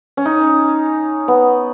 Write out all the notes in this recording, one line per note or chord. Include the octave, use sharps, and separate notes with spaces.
C#4
D#4
B3